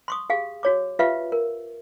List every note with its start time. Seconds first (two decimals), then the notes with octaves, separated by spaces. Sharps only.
0.08 C6 C#6 D#6
0.30 G4 G#4 F5
0.63 F#4 C#5 D6
0.99 F4 G4 B4 E5 F5
1.32 A#4